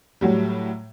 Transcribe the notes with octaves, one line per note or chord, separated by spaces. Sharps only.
A2 F#3 G3